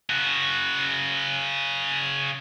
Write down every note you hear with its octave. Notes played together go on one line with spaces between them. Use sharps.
C#3 F#4